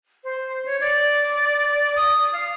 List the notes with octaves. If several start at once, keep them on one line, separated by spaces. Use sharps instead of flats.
C5
C#5
D5
D#6
F5